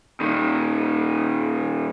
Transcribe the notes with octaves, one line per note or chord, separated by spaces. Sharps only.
A#2 D#3